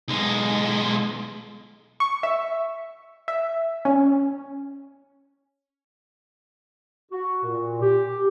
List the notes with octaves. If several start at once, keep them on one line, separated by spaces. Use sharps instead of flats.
B1 G#3
C#6
E5
E5
C#4
F#4
A#2
G4